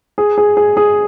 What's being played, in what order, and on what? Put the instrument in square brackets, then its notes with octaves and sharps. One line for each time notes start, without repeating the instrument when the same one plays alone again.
[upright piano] G#4
G#4
G#4
G#4